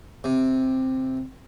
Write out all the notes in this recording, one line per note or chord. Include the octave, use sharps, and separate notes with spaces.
C3